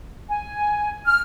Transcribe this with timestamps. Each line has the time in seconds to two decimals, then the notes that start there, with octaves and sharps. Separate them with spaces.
0.29 G#5
1.05 F6